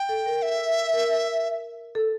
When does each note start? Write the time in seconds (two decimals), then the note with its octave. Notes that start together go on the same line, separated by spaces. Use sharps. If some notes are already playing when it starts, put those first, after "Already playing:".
Already playing: G5
0.09 A4
0.26 A#4
0.42 E5
0.93 A#4
1.95 A4